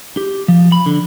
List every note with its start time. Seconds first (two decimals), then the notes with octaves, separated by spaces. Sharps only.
0.17 G4
0.48 F3
0.72 B5
0.86 D3